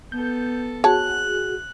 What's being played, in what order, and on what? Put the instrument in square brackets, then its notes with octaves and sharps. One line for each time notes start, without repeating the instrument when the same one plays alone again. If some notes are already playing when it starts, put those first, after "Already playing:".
[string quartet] B3 A4 [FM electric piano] G6
[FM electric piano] F#4 G#4 [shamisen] C#5 A5 [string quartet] F#6